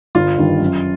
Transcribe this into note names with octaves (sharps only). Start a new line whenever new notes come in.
G1 F4
G2 D#3
F#2